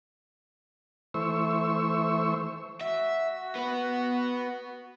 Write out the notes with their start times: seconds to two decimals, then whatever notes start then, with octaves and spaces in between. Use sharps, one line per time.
1.14 E3 A3 C5 C#6 E6
2.81 F#4 E5
3.55 B3 B4